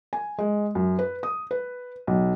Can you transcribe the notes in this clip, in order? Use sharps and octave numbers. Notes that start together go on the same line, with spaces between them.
G#5
G#3
F#2
B4
D#6
B4
B1